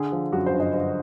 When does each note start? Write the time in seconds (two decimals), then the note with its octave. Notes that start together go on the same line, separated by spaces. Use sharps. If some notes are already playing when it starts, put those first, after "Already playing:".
Already playing: D3 G#4
0.12 F3
0.33 F#2 F#4
0.46 C5
0.53 G1
0.60 D#5
0.74 D3 C5